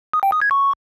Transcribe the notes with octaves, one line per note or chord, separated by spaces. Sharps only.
D#6
G5
D#6
G#6
C#6